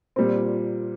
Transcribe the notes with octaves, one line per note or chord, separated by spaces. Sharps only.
A#2 G3 C4